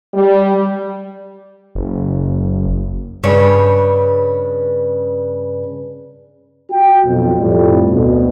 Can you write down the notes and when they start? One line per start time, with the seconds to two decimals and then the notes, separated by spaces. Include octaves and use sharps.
0.14 G3
1.75 F#1
3.23 G2 C#3 C#5
6.71 F#4 G5
7.05 B1 F2
7.39 F2 A2 G3
7.89 D2 B2